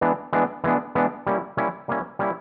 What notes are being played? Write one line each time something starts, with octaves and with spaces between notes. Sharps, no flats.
E3 G#3 B3 D4
E3 G#3 B3 D4
E3 G#3 B3 D4
E3 G#3 B3 D4
G3 A#3 C#4 E4
G3 A#3 C#4 E4
G3 A#3 C#4 E4
G3 A#3 C#4 E4